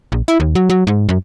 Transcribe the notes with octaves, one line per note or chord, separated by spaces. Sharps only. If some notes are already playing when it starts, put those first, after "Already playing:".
A#1
E4
D#2
F#3
F#3
G#2
F#2